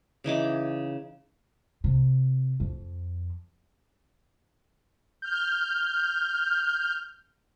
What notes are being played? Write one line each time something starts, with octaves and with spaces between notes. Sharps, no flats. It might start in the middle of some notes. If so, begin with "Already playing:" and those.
C#3 E3 D#4 D6
C3
F2
F6 G6